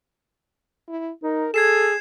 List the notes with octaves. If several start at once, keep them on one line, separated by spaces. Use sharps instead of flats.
E4
D#4 A#4
G#4 A4 G#6 C7 E7